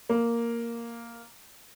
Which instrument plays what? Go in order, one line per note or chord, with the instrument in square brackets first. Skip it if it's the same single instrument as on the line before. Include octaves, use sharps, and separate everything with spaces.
[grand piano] A#3